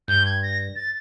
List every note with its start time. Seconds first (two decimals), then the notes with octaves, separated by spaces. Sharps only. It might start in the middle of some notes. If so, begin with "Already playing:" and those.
0.08 G2 G6
0.26 G#6
0.42 A#6
0.76 A6